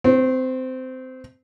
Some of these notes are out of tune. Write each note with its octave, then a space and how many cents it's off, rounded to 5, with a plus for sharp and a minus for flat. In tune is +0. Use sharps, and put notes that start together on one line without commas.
C4 -20 C5 +45